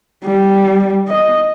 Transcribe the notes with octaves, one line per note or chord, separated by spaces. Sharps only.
G3
D#5